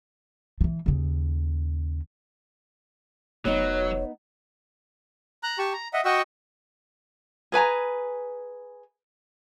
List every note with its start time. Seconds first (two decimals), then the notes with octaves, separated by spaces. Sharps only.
0.61 E3 F3
0.86 D#2 C#3
3.45 F1 F#3 B3 D#4 C#5
5.43 A#5 F#6
5.58 G4 A5 C#6
5.73 A#5
5.93 D#5 E5 F#5
6.05 F#4 D#5 F#5 G5 C#6 E6
7.52 G#4 B4 G#5 A#5